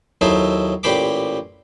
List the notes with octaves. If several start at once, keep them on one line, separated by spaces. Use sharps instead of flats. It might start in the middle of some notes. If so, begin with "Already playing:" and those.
D#2 F#3 D#4 E4 A4 C5
A1 A#2 G4 C5 B5 D6